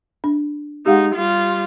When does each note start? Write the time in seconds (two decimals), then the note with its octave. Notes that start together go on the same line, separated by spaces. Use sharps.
0.24 D4
0.86 G#3 D#4 G4 F5 F#5
1.15 G3 F4